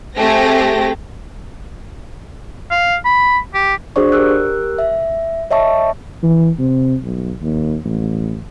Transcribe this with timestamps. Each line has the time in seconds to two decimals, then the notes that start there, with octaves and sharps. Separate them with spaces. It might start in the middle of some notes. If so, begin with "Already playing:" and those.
0.16 A3 C4 G4 G#4 A#6
2.71 F5
3.05 B5
3.54 G4
3.96 D4 F#4 G#4 C5 D5 C#6
4.12 G4 A#4 E6 F#6
4.78 E5
5.51 C#5 D#5 E5 A5 C#6
6.23 E3
6.59 C3
7.03 B1
7.42 D#2
7.85 A1